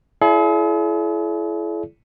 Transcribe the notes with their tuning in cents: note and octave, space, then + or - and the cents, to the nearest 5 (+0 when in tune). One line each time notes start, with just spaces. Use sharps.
E4 +25 G#4 +45 D5 -30